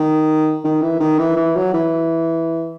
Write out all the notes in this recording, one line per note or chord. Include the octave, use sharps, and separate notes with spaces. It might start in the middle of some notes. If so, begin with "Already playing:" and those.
Already playing: D#3
D#3
E3
D#3
E3
E3
F#3
E3